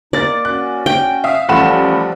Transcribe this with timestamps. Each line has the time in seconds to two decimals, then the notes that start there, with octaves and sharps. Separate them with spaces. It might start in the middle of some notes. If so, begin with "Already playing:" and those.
0.13 A#3 D#4 D5 A6
0.45 C#4 F#4 F#6
0.86 G5
1.24 E5 F5 D#6
1.49 A1 F3 G3 F4 A4 F#5 B5 E7